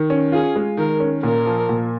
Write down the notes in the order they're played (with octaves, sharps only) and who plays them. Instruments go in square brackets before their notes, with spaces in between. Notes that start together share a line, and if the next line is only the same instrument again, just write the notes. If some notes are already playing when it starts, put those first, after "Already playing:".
Already playing: [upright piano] D#3
C#4
[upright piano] F4 [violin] G#4
[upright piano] G#3
[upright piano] D#3 [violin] A#4
[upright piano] C#4
[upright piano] A#2 [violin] A#4
[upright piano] F3
A#2